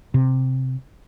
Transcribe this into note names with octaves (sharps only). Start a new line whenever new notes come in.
C3